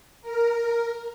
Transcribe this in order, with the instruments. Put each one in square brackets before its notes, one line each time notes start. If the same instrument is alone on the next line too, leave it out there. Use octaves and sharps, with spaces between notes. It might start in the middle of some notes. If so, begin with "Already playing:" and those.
[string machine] A#4